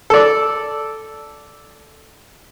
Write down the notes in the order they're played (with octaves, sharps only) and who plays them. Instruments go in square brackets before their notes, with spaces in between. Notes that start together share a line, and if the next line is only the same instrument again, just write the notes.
[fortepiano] A4 D5